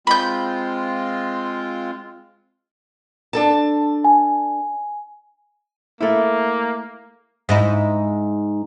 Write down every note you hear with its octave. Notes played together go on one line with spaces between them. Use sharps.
G#3 C4 F4 B5 G6
D4 A4 A5
G#5
A3 A#3 E4
G#2 D#4 E4